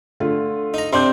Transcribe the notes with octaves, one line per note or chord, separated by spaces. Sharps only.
D3 A3 F4
D#4 A#5
C3 D4 C6 G6